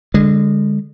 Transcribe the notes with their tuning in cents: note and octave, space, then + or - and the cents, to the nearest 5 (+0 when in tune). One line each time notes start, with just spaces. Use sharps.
D3 +0 G#3 -25